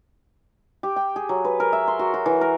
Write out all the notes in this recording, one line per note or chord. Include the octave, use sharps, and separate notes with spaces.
G4
G5
G#4
F#3
B4
A#4
E5
C6
F#4
F#4
E3
A#4